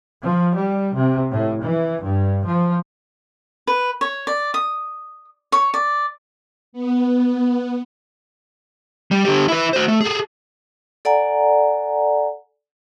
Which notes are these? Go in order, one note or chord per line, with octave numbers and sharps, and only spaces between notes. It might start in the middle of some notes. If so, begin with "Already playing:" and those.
F3
G3
C3
A2
E3
G2
F3
B4
C#5
D5
D#6
C#5
D5
B3
G3
D3 G4
E4 B4
F#4 C5
A3
G#4 A4
A4 D5 F#5 G#5 A#5